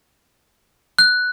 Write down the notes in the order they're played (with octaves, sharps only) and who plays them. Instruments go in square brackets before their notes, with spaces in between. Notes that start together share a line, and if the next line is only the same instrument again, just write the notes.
[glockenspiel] F#6